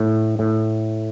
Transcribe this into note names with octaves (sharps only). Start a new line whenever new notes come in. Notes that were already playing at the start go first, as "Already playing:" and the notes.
Already playing: A2
A2